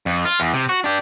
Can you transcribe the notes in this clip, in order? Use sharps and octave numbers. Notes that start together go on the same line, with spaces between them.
F2
F4
E2
C3
F#4
D4 G4